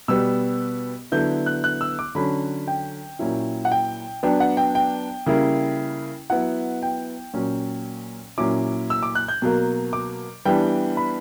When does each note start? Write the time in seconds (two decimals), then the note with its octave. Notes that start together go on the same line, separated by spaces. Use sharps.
0.08 B2 G3 B3 E6
1.12 D3 F#3 B3 E4 G6
1.46 F#6
1.64 F#6
1.81 E6
1.99 D6
2.15 D3 F#3 C#4 B5
2.67 G5
3.19 A#2 F#3 C#4 E4
3.65 F#5
3.72 G5
4.23 F#3 B3 D4 G5
4.40 F#5
4.57 G5
4.75 G5
5.26 C#3 G3 A#3 E4
6.30 F#3 B3 E4 F#5
6.83 G5
7.34 A#2 F#3 C#4
8.38 A#2 F#3 C#4 E4 D6
8.90 E6
9.03 D6
9.15 F#6
9.28 G6
9.42 B2 F#3 A#3
9.93 D6
10.45 E3 G3 B3 D4 G5
10.97 B5